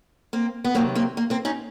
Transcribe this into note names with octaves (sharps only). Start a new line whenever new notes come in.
A#3 C4
B3
C3 D#3 F#3 A#3 C4
A#3 C4
A#3
A#3 C4
C#4 D#4